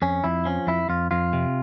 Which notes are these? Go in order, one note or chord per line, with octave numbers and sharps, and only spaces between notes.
F2 C#4
F2 E4
F3 C#4
F2 E4
F2 F4
F2 F4
C3